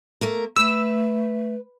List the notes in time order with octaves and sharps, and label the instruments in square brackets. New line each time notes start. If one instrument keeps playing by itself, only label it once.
[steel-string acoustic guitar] A3 A#3 A#4
[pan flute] A3 [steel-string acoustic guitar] B4 [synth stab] E6